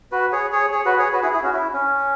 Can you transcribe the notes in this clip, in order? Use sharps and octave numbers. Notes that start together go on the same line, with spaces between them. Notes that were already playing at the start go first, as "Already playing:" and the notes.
F#4 B4
G#4 C#5
G#4 C#5
G#4 C#5
F#4 B4
G#4 C#5
F#4 B4
E4 G#4
E4 G#4
C#4 F#4
E4
C#4